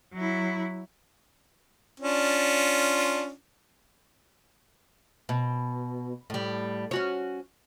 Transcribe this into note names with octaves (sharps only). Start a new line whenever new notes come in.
F#3 E4
C#4 D4 F4
B2
A2 G3
C#4 F#4 C#5